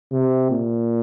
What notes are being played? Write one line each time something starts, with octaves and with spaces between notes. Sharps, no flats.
C3
A#2